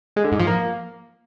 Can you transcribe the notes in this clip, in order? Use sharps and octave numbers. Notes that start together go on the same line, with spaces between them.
G#3
D3
G#2
F3
A#3